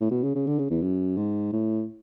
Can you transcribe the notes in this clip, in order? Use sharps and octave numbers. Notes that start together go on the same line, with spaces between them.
A2
B2
C#3
C#3
D3
C#3
E2
F#2
G#2
A2